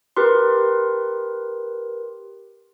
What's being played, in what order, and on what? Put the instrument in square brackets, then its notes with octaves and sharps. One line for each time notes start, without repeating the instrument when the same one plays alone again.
[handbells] G4 A#4 B4 C6